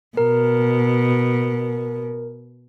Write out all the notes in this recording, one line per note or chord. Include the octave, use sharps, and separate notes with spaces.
B2 A#4